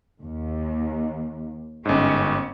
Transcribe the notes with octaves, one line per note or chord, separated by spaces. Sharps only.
D#2
G1 G#2 C#4